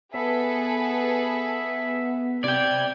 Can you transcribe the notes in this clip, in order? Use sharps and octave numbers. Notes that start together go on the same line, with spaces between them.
B3 G#4 A4 B4 E5
C3 D5 G5 G#6